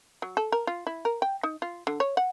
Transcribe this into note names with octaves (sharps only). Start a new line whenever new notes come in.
F#3
A4
A#4
F4
E4
A#4
G5
D#4
F4
D3
C#5
F#5